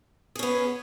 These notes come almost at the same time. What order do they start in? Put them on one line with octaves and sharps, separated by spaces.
G#4 C#4 B3